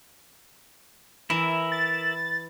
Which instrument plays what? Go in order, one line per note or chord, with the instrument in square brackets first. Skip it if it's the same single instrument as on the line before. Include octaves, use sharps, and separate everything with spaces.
[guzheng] E3 [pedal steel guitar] E4 A#4 E5
[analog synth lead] A6